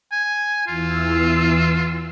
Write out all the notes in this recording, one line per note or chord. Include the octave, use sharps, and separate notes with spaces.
G#5
E2 E3 F4 E6